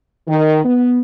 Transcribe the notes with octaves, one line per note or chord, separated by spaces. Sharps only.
D#3
B3